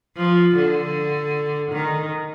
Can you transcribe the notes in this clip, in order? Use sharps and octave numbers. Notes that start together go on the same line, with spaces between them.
F3
D3
D#3